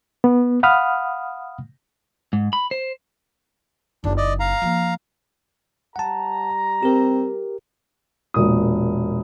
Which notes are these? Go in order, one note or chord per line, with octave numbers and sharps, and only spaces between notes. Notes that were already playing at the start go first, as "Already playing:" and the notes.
B3
F5 F#5 B5 D#6 F6
G#2
B5
C5
F#1 D4 D#4
D5 D#5
F5 A#5
F3 A#3
G3 F#5 A5 A#5
C4 G4 A#4
E1 A#2 D#6